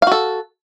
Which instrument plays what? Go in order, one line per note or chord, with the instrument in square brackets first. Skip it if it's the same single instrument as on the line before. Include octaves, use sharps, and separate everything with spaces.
[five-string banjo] F5
F#4
A4